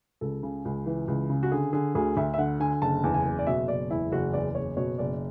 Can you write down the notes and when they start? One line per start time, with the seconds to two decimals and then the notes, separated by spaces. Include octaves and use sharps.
0.21 C#2 A4
0.43 C#3
0.65 C#2
0.86 E3
1.08 C#2
1.30 C#3
1.43 F#4
1.52 D3 G#4
1.73 D3 G#4
1.95 D2 G#4
2.17 D2 E5
2.34 E5
2.38 D3 F#5
2.60 D3 G#5
2.82 F#1 A5
3.04 E2
3.14 G#5
3.25 F#1
3.39 D5
3.47 B2 E5
3.68 F#1 D5
3.90 E2 E4
4.12 F#1 F#4
4.34 E2 D5
4.55 F#1 C#5
4.77 B2 C#5
4.98 F#1 D5